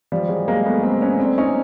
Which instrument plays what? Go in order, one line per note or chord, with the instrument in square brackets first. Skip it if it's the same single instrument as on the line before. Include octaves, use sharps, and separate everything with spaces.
[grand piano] F3 G3
F#3 G#3
G#3 A#3
A3 B3
A#3 C4
B3 C#4
C4 D4
C#4 D#4